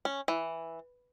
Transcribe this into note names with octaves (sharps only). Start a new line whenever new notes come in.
C#4
E3